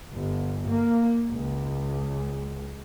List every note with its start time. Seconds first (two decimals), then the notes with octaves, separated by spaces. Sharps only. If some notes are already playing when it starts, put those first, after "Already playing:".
0.11 G1
0.66 A#3
1.32 C#2